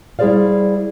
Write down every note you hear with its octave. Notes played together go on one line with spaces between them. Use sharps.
G3 E4 G#4 C5 D5 F5